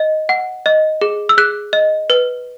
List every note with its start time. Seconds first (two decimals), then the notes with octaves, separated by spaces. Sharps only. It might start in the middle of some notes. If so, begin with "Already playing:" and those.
Already playing: D#5
0.29 F#5
0.66 D#5
1.01 G#4
1.29 E6
1.38 G#4 F#6
1.73 D#5
2.10 B4